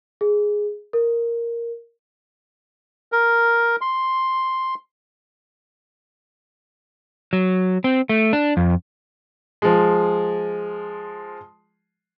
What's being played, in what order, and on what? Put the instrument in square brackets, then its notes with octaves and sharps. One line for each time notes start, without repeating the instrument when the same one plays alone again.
[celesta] G#4
A#4
[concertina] A#4
C6
[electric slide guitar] F#3
C4
A3
D4
F2
[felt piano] F3 G#3